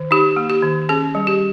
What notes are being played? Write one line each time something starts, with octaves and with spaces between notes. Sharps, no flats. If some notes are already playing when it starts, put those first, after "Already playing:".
Already playing: D#3
D#4 G4
A#3
G4
D#3
C#4 G#4
G3
G4